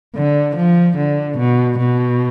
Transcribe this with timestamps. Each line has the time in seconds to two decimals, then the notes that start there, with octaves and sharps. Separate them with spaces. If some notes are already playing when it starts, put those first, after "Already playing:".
0.15 D3
0.56 F3
0.97 D3
1.38 B2
1.79 B2